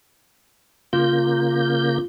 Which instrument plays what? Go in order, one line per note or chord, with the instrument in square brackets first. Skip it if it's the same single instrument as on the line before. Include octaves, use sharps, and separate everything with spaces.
[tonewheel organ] C#3 A#3 G6 [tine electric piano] F4